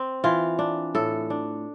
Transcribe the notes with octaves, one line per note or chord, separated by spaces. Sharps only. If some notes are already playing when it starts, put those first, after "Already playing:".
Already playing: C4
E3 F4
D4
A2 A4
D4